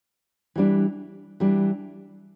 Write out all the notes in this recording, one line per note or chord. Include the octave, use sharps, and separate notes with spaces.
E3 G3 D4
E3 G3 D4